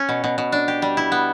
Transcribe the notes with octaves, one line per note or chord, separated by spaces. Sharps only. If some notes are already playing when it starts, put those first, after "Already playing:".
Already playing: C#4
B2
B2
B2
D4
G4
G3
E4
B3